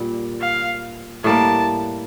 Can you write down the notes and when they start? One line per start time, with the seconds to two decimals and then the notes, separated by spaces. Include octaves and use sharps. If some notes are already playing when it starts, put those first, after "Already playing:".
Already playing: A#2 G3
0.41 F5
1.24 A2 G3 A#3 A5